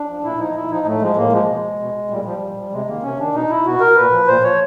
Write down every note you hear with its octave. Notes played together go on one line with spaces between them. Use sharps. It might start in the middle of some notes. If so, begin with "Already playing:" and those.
Already playing: D4
F3
A#2 E4
F3 D#4
A#2 E4
F3 D#4
A2 A3
F3 G#3
A2 A#3
F3 G#3
B2
B2
A#2 G3
F3 G3
A#2
F3
C3 G#3
D#3 A#3
C3 C#4
D#3 D4
B2 D#4
E4
B2 F#4
A#4
A#2 B4
F3
A#2 C5
F3 C#5